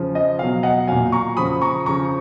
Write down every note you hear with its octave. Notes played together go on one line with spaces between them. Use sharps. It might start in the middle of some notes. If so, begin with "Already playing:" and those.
Already playing: C#3 F3
D#5
B2 F#3 F5
D#5 F#5
A#2 F#3 F5 G#5
A#5 C#6
C#3 F3 B5 D#6
A#5 C#6
C#3 F3 A#5 C#6